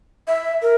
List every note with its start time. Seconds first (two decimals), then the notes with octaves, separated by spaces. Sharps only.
0.28 E5
0.62 A#4